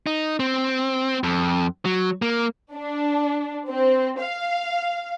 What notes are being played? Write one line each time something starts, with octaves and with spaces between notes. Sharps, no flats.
D#4
C4
F2
F#3
A#3
D4
C4
F5